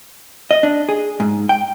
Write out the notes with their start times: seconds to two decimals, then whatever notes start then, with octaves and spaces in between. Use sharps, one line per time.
0.51 D#5
0.63 D4
0.89 G#4
1.20 G#2
1.49 G5